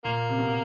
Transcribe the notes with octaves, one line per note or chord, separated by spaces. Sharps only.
A#2 A#3
C3
B2